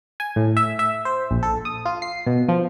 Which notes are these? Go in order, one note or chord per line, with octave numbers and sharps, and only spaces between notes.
G#5
A2
E5
E5
C5
A#1
A4
D#6
F4
C7
B2
F3